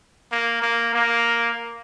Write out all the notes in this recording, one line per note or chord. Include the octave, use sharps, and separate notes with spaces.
A#3
A#3
A#3